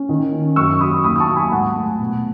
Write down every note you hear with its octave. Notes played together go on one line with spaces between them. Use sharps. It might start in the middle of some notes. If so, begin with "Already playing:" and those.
Already playing: C#4
D#3
C#4
F#2 C#6 E6
F#3 B5 D#6
D#2 B5 D#6
D#6
A5 C#6
F#3
G#5 B5
G#2 F#5 A5
A3
B2